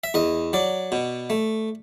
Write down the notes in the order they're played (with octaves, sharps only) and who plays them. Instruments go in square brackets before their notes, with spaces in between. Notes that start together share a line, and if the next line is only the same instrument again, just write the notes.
[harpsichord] E5
E2 D#5
F#3 D5
B2
A3